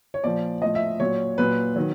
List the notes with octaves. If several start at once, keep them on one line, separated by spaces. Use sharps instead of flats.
C#5
A#2 F3 D5
A2 F3 D#5
E5
A#2 F#3 C#5
A#2 F#3 B4
D#3 F#3